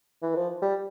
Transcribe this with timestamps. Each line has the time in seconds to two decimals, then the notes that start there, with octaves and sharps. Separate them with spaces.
0.22 E3
0.35 F3
0.62 G3